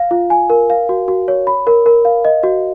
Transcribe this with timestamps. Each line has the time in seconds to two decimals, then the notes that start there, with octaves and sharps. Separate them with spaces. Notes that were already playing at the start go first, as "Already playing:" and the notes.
Already playing: F5
0.11 F4
0.30 G#5
0.50 A#4
0.70 F5
0.89 F#4
1.08 F#4
1.28 C#5
1.47 B5
1.67 A#4
1.86 A#4
2.05 F5
2.25 D#5
2.43 F#4